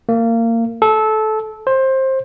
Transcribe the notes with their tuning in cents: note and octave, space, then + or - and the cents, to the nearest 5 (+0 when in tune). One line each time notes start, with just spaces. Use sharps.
A#3 -25
A4 -20
C5 +20